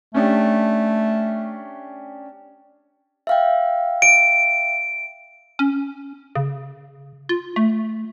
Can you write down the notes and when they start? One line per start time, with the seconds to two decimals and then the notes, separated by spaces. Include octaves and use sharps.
0.14 A3 C#4 D4 G4
3.27 E5 F5 G5
4.02 D7
5.59 C#4
6.36 C#3
7.29 F4
7.56 A3